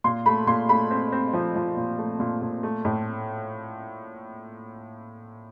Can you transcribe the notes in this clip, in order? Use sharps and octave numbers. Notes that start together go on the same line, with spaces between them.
A#2 C6
A3 B5
A#2 C6
A3 B5
C4
C4
F3
F3
A#2
A3
A#2
A#2
A3
A2